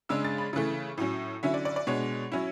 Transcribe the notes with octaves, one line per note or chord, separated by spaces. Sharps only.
C#3 G#3 D4 E6
A6
B5
C#3 E3 A3
A2 F#3 C#4
D3 F#3 C#4 E4 E5
D5
D5
D5
B2 G#3 D4 C#5
F#3 C#4 E4